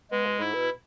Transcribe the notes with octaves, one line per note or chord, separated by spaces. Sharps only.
G#3 B3
B2
G#2 E4
B2